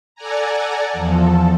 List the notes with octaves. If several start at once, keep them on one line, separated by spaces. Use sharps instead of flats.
A4 D5 F#5 G#5 A#5
E2 F3 A4